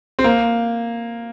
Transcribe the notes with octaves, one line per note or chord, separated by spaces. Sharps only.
C4
A#3